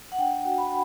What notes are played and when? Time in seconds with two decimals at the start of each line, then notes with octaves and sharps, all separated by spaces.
0.12 F#5
0.18 D4 G5
0.45 F#4
0.58 B5